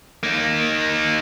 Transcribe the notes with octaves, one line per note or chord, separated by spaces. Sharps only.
A#3 D#4